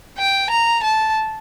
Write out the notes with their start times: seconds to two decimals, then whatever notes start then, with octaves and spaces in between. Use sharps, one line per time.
0.18 G5
0.50 A#5
0.83 A5